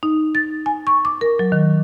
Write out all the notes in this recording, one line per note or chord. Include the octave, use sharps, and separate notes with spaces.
D#4
A6
G#5
C#6
D6
A#4
F#3
D#3